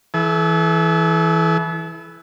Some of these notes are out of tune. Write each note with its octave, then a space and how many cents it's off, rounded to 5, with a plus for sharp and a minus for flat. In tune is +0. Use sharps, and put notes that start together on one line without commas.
E3 +0 A4 -45